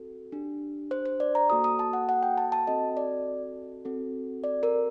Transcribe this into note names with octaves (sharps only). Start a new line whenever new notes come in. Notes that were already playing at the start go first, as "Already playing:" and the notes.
Already playing: C4 F#4 A4
D4 G4
C5
C5
D5
A#5
A#3 F#4 A4 D#6
D#6
A5
F#5
F#5
G5
A5
A5
C4 F#4 A4 D#5
D5
C4 F#4 A4
D5
A#4